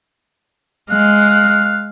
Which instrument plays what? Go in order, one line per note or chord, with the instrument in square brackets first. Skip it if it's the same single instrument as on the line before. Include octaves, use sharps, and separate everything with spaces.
[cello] G#3 [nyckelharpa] F5 [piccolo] F#6